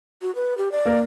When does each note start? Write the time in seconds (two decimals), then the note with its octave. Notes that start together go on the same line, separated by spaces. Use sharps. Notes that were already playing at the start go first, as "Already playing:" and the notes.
0.22 F#4
0.35 B4
0.58 G4
0.72 D5
0.86 A#3 A#4